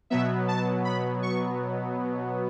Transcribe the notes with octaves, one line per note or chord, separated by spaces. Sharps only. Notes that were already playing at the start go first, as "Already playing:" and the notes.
B2 F#3 B3 E5
A5
B5
C#6